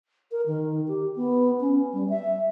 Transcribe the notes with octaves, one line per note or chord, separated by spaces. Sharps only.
A#4
D#3
G4
B3
C#4
G3
E5